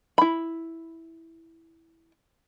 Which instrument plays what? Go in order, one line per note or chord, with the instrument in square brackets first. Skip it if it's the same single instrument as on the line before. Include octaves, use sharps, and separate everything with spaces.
[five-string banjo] E4 B5